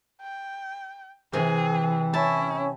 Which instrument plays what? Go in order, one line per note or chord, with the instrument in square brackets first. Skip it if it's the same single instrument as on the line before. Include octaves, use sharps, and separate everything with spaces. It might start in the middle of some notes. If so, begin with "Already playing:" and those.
[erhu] G5
[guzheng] C3 [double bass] E3 [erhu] G#4
[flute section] C#4 [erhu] E4 [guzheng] A5